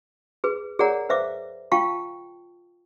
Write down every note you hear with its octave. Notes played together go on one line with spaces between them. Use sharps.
G#4 B4
G#4 A#4 C#5 D5 F#5 A#5
B4 C5 E5 F5 D6
F4 F5 G5 A5 C#6